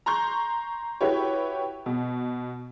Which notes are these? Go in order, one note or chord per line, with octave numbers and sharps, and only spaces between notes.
A#5 C6 C#6 G6
E4 F#4 G4 B4 C#5
B2